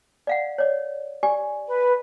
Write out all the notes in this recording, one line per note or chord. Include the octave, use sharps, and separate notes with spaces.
D5 F5 F#5
C#5 D5
G4 D5 G#5
B4